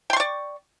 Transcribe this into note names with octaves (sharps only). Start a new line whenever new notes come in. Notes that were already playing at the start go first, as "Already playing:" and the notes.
D5 G5 C6 C#6